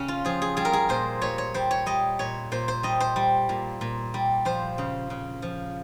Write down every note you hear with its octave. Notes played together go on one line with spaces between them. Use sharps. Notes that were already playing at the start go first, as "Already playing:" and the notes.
Already playing: C#3 C#4
F4
F3 G#4
G#4
G3 G#4
A#4
G#4
A#2 C5
A#2 C#5
C#5
G3 C5
C#5
G3 D#5
A#2 C#5
A#2 C5
C5
G3 D#5
C5
G3
A#2
A#2
G3
F3 C5
C#3
C#3
F3